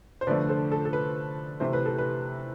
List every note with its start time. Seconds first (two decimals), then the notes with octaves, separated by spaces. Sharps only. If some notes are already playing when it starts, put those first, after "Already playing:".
0.21 C5
0.27 D3 F3 A3 B4 D5
0.49 A4 C5
0.72 A4
0.85 A4
0.93 B4
1.60 C3 E3 A3 C5
1.73 B4
1.86 A4
1.98 B4